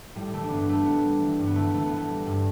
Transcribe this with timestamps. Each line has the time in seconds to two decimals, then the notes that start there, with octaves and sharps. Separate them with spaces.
0.15 A2 G3
0.33 E3 A3
0.44 D4
0.50 G2 B3
0.68 G3 A3
0.85 A2 B3
1.04 G3
1.21 E3
1.39 G2
1.47 B3
1.56 E3 A3
1.74 E3 A3
1.85 B3
1.91 A2 A3
2.09 G3
2.26 G2